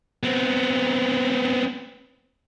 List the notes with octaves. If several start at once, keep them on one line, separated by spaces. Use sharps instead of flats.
B3 C4